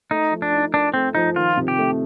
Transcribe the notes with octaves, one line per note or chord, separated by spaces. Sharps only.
A3 D#4
F3
D4
D#4
D4 A#4
A3 C4
F3 D#4
D#3 F4
C3
G4
A3